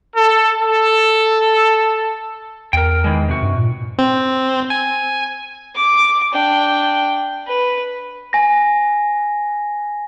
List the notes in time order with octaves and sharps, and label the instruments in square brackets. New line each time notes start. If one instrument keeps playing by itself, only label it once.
[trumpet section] A4
A4
[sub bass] E2 [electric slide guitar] A#4 G5
[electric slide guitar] D#3 E3 G#3
C3 F#4
[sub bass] G2
A#2
[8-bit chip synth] C4
G#5
[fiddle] D6
D4 G5
B4
[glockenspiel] G#5 A#6